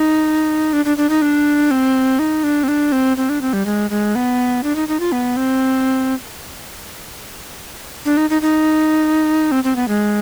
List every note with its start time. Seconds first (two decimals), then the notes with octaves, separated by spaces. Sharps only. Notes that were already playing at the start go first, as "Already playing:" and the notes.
Already playing: D#4
0.73 D4
0.85 D4
0.97 D4
1.09 D#4
1.22 D4
1.71 C4
2.19 D#4
2.44 D4
2.64 C4
2.68 D4
2.92 C4
3.17 C4
3.29 D4
3.41 C4
3.53 G3
3.66 G#3
3.90 G#3
4.15 B3
4.63 D4
4.76 D#4
4.88 D#4
5.00 F4
5.12 B3
5.37 C4
8.05 D4
8.17 D#4
8.30 D#4
8.42 D#4
9.52 C4
9.64 C4
9.76 B3
9.88 G#3